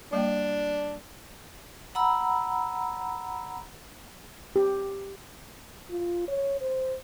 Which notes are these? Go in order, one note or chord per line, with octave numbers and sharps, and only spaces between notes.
G3 A#3 D4 G5
F#5 A#5 B5 E6
G4
F4
C#5
C5